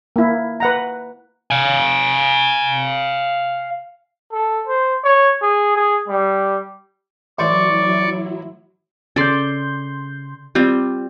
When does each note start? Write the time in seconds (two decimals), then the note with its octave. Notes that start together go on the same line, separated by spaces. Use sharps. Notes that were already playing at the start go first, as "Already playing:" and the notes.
0.16 A#3 E4
0.60 B4 F#5 A#5
1.51 F5 G#5
4.32 A4
4.67 C5
5.04 C#5
5.42 G#4
5.76 G#4
6.08 G3
7.39 A1 F#3 E4 C5 D5 C#6 D6
9.16 C#3 A4 D5 C6 G6
10.55 G3 C4 F4